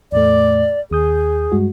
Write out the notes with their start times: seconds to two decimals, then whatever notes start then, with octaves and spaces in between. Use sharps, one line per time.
0.12 E2 A2 A3 D5
0.91 D#2 G#4 D#6 G6
1.52 G2 G#3 F#4